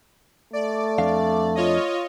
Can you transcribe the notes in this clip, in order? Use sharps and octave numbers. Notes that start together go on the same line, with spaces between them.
A3 D5
F2 D4 F5
F4 C#5 D#5